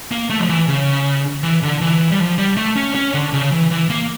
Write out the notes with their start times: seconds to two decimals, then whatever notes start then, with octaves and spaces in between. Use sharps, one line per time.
0.11 A#3
0.30 A3
0.40 F3
0.49 E3
0.68 C#3
1.43 E3
1.63 D3
1.81 E3
2.11 G3
2.19 F3
2.38 G3
2.57 A3
2.76 C#4
2.95 C#4
3.14 D3
3.34 C#3
3.52 E3
3.71 E3
3.90 A#3